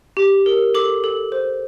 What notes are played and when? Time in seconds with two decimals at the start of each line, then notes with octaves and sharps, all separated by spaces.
0.17 G4
0.46 A#4
0.74 A4 D6
1.04 A4
1.32 C5